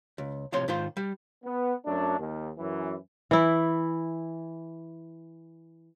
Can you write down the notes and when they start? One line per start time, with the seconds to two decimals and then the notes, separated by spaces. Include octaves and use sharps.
0.18 C#2
0.52 B1 A2 C3 F3 C#5 C6
0.68 G#2 D#3 F4 C5
0.97 G3
1.44 B3
1.85 F#2 F#3 A3 D4
2.19 D#2
2.58 F#2 E3
3.31 E3 E4